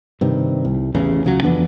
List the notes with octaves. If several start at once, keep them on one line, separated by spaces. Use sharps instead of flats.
G2 C3 D#3
C2
A1 E2 A2 C#3
C#2 C#3 F#3
F2 E3 B3 D4